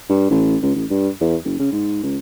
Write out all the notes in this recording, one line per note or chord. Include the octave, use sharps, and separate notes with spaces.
G2
A1
C#2
A1
G2
E2
F#1
C#3
G#2
C#2